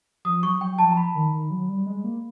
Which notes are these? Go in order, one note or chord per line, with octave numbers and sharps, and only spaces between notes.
F3 D#6
F#3 C#6
F#3 G5
F3 A5
A#5
B5
D#3
D#3
F#3
G3
G#3
A#3